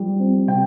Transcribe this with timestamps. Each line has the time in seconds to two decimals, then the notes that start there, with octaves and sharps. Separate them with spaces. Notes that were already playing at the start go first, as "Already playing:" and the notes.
Already playing: F3 G3
0.20 C4
0.47 C3 G5